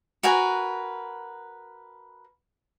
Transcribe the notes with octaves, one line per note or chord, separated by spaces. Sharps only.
F#4 A#4 B4 G#5